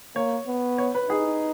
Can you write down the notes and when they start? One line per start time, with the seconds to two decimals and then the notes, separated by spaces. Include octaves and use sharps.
0.16 A#3 C#5
0.47 B3
0.78 C#5
0.95 B4
1.09 D#4 G#4